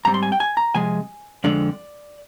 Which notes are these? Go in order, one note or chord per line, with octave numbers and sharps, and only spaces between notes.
G#2 G3 C4 A#5
C6
G#5
G5
G#5
A#5
C3 F3 G#3 G#5
F2 D3 G#3 D5